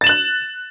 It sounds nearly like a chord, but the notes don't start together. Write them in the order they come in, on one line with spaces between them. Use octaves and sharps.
A6 E7 F#7 F#6